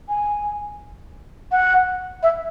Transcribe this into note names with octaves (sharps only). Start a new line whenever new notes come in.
G#5
F#5
E5